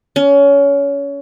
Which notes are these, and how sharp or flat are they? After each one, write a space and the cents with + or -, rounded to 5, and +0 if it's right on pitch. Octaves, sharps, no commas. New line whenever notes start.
C#4 +25